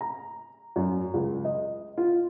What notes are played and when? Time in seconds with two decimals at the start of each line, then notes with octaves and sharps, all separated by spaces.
0.01 A#5
0.76 F#2
1.14 C#2
1.45 D#5
1.98 F4